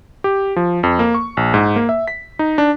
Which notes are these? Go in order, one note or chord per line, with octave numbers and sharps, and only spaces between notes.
G4
F3
F2
A#3
C#6
A#1
G#2
A#3
E5
B6
D#4
D4